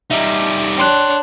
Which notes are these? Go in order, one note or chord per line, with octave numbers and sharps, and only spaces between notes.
G3 D#4 E5
D4 C#5 G5 C6 F#6